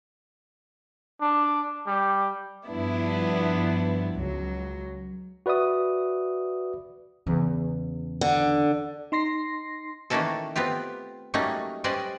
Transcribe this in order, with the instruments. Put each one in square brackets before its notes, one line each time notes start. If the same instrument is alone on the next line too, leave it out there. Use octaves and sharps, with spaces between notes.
[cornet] D4
G3
[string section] G2 F3 B3 D4 E4
C#2 F#3
[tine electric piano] F#4 B4 D5 E5 D#6
[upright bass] E2 C#3
[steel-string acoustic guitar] D3
[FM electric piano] D#4 C6 A#6 C7
[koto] D#3 E3 A3 A#3 C#4 A4
B3 C4 F4 G4
F#3 G3 A3 A#3 C#4 D#4
G3 C#4 B4 C5 D5 D#5